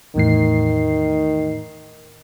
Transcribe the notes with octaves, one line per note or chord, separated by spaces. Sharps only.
E2 A2 D#3 C7